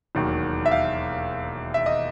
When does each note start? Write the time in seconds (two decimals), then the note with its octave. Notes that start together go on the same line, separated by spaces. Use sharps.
0.15 E1 D#2 D#3 F#3
0.66 E5
0.71 F5
1.74 E5
1.86 D#5